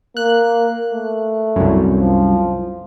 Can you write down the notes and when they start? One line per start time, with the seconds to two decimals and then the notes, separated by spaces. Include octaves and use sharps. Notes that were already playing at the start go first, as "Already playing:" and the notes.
0.17 A#3 F#6
0.93 A3
1.56 C2 F#2
1.99 F3